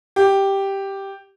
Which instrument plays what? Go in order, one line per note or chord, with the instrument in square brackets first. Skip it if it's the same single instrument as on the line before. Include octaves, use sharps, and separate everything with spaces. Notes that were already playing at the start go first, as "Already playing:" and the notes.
[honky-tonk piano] G4